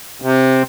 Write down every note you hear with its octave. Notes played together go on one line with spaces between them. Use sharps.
C3